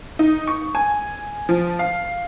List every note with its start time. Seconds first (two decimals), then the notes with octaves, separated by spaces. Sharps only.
0.19 D#4
0.47 C#6
0.75 G#5
1.49 F3
1.79 F5